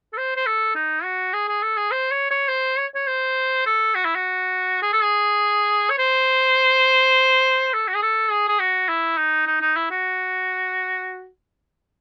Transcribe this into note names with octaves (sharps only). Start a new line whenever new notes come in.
A4
C5
C5
A4
D#4
F#4
G#4
G#4
A4
G#4
C5
C#5
C#5
C5
C#5
C#5
C5
A4
F#4
E4
F#4
G#4
A4
G#4
C#5
C5
A4
F#4
G#4
A4
G#4
G#4
F#4
E4
D#4
D#4
D#4
E4
F#4